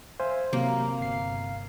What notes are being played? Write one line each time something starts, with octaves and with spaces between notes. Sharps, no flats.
C5 E5 F5 G#5
C3 F#3 A#3 F5
G1 C7